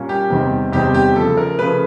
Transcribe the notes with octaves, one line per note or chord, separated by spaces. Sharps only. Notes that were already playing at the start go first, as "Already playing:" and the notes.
Already playing: A#2 G3 A#3 C#4
G4
E2 C3 D#3 G3 C4
E2 C3 D#3 G3 C4 G4
G4
C#3 F3 A3 A4
A#4
C#3 F3 A3 B4